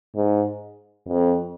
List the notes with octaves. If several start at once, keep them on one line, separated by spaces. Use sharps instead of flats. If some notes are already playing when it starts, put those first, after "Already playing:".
G#2
F2